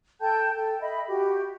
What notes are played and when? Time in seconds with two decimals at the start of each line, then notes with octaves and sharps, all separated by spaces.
0.21 A4 G5 A5 G6
0.55 A4 G5
0.81 D#5 E5 B5
1.08 F#4 G4